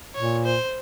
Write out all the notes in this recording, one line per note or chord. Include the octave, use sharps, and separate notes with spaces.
A#2 C#5
C5